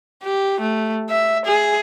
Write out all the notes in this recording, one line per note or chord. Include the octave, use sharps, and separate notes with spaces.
G4
A3
E5
G#4